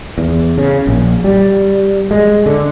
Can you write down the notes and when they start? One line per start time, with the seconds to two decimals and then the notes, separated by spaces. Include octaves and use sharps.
0.18 E2
0.58 C#3
0.87 A#1
1.24 G3
2.11 G#3
2.46 D3